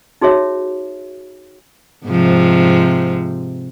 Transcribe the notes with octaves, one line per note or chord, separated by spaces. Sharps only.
D#4 F#4 G#4 C#5 E5
G#2 C3 F3